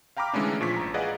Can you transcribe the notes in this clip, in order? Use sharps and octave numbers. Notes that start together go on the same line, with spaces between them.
F5 G5 A#5 B5 D6 F6
D3 E3 G#3 A3 C#4 D4
A#2 F3 C#6 B6
A1 A#5
G#4 B4 D5 D#5 F5 F#5